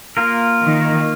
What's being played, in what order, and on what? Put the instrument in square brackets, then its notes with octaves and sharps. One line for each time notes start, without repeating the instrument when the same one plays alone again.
[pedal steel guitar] A#3 F4 A#4
[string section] D#3